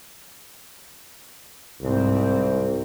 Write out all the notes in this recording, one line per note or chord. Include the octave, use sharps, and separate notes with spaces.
C2 G#2 C4